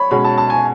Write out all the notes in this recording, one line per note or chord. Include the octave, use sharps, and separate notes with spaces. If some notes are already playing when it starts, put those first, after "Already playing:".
Already playing: C#5 B5
B2 G#3 C#4 B5
A5
A5
G#5